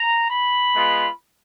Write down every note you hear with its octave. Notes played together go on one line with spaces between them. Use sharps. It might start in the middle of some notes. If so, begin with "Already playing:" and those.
Already playing: A#5
B5
G#3 B3 F4